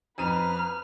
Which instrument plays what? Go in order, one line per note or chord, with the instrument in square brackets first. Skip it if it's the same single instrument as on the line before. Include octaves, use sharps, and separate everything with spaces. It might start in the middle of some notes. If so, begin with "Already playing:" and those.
[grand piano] F2 D#7 [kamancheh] B4 F6 [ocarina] A#5